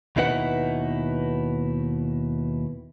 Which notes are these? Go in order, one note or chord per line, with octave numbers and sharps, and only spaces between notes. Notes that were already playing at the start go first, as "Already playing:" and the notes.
D#2 B2 D#4 E4 B4 F#5